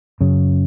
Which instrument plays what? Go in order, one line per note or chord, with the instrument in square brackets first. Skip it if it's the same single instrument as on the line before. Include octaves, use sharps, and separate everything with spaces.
[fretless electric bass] F#2 C#3